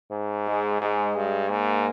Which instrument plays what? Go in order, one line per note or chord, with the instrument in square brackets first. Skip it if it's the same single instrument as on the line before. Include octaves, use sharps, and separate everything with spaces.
[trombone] G#2
[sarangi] G#3
[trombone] G#2 [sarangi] G#3
[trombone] G2
[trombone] G#2 [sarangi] A#3